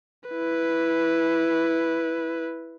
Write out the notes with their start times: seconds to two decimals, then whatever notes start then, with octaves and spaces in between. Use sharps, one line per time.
0.30 E4 B4